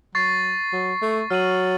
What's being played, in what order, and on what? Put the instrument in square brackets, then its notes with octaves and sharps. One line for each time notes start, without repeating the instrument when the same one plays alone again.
[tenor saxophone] F#3 [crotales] C#6 A6 C7
[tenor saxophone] F#3
A3
[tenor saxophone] F#3 [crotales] F6 C7 D#7 F#7